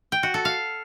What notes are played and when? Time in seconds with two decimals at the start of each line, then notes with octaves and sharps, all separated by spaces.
0.12 G5
0.23 F#4
0.34 A4
0.45 F5